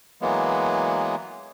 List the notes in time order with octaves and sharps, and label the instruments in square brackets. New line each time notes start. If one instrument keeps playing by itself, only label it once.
[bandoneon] E3 F#3 G#3 A#3 B3